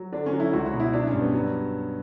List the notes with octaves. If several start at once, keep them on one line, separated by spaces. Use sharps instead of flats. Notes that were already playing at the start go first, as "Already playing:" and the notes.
Already playing: F#3
D3 D4
C#4
F#3
E4
C#2 F#4
F#4
B2
E4
F#3 D4
C#4
G2
B3
F#3